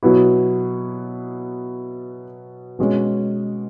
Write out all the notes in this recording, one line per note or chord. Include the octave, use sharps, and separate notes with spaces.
B2 F#3 B3 E4
B2 G#3 C#4